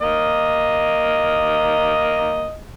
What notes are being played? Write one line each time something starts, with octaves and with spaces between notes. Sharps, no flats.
A#3 D#5